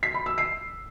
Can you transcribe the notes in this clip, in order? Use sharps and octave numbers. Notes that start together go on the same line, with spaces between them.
B6
B5
E6
C7